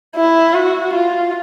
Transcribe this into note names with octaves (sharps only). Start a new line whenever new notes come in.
E4
F#4
F4